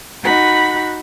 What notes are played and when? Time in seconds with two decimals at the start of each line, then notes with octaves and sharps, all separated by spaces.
0.24 D#4 F#4 F#5 B5